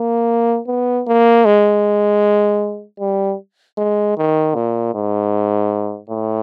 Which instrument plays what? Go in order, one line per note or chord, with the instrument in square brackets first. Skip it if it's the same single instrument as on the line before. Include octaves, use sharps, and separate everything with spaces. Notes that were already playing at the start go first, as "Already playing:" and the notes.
Already playing: [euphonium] A#3
B3
A#3
G#3
G3
G#3
D#3
A#2
G#2
A2